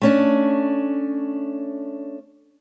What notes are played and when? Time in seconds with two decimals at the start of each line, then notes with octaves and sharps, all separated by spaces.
0.02 A3 C#4 D4